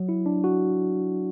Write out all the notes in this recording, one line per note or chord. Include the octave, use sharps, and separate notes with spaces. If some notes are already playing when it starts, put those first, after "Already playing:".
Already playing: F#3
E4
D4
F#4